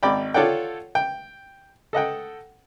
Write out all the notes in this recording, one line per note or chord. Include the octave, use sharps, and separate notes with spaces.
G#1 D5 G5 B5
F4 A4 C#5 D5 F#5 G5
G5
A4 D#5 F#5 G5